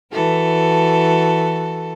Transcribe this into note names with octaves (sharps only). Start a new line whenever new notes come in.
E3 F#4 A4